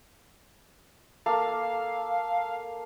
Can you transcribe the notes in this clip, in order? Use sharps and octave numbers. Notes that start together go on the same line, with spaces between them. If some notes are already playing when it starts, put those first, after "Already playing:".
A#3 A4 F5